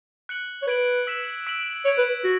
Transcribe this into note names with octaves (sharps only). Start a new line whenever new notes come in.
F#6 C#7 F#7
C#5
B4 G#6 D7 F#7
E6 B6 E7
E6 B6 D7 F#7
C#5 G#6 D7 F#7
B4
F#4